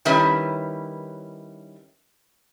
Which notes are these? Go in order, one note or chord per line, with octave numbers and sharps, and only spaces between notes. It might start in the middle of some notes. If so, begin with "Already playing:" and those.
D#3 G3 C#4 E4 B4